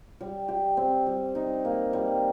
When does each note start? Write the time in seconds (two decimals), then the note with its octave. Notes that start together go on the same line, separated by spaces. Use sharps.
0.21 G3
0.48 G4
0.77 C4
1.06 G3
1.35 D#4
1.65 A#3
1.93 G3